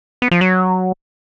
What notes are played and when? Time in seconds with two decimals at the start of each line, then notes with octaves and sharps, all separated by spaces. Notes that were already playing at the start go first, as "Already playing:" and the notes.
0.22 B3
0.31 F3
0.41 F#3